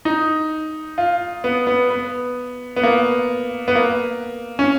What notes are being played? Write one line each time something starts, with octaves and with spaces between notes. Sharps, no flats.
D#4
F4
B3
B3
B3
B3
A#3
B3
A#3
C#4